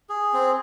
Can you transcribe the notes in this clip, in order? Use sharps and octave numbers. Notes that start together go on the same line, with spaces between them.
G#4
C4